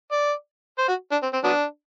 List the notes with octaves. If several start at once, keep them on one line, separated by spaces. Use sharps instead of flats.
D5
C5
F#4
D4
C4
C4
F#3 B3 D4